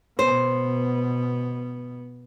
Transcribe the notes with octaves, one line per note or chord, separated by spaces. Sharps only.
B2 B3 C5